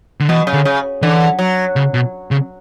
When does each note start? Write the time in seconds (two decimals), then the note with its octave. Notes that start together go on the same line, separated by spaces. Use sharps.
0.20 D3
0.28 B2 E3
0.47 C#3
0.53 D3
0.65 C#3
1.02 D3 E3
1.39 F#3
1.76 C#3
1.94 B2
2.31 C#3